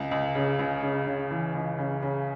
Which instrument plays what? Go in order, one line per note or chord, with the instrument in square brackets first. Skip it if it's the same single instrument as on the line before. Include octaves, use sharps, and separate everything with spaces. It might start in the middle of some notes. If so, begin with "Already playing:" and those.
Already playing: [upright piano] C#2
C#2
C#3
C#2
C#3
C#3
E3
C#2
C#3
C#3